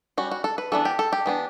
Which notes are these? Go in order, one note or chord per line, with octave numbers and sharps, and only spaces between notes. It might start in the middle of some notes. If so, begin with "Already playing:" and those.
G3 C#4 F#4
F#4
A4
B4
E3 B3 D4 A4
G4
A4
G4
E3 B3 D4